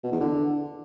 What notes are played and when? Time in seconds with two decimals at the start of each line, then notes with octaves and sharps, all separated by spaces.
0.04 B2
0.12 E2
0.20 D3